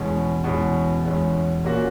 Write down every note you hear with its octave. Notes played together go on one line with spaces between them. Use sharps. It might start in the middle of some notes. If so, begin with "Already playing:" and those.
Already playing: E2 B2 G#3 C#4
E2 B2 G#3 C#4
E2 B2 G#3 C#4
A#2 A#3 C#4 F#4